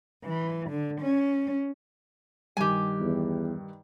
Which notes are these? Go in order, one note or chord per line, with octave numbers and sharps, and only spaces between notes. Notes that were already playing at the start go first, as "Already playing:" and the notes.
E3
D3
C#4
G2 D#3 G4 G#5
E2